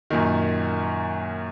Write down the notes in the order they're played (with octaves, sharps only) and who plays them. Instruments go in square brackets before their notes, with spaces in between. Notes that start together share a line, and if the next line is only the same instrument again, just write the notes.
[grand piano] F#2 A#2 D#3